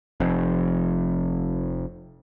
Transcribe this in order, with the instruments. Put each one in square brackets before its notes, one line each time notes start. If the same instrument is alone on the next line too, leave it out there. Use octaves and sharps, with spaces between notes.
[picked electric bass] F1 F2